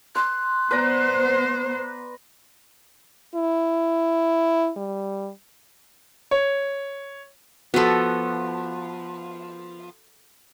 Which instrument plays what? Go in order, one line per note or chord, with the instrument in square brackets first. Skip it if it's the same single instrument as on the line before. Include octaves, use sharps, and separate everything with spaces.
[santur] C6 [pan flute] F#6
[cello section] B3 C5 [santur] B4 D5 A#5
[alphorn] E4
G3
[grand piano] C#5
[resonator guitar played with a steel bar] F3 B3 [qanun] F#4 A4